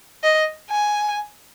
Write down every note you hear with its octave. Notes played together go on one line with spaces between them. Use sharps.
D#5
G#5